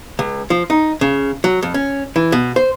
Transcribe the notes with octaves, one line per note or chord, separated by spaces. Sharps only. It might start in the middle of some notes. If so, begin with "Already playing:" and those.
C#2
F3
D#4
C#3
F#3
F2
C#4
E3
B2
C5